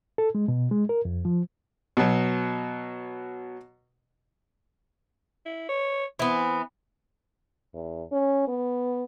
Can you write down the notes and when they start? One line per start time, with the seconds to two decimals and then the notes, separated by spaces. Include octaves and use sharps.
0.18 A4
0.35 G#3
0.48 B2
0.71 G#3
0.89 A#4
1.05 F2
1.25 F3
1.97 B2 F#3
5.45 E4
5.69 C#5
6.19 E3 B3 C4
7.74 E2
8.12 C#4
8.48 B3